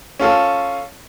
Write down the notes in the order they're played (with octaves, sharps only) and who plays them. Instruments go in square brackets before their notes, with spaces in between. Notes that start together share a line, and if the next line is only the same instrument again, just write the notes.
[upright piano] C#4 F4 A4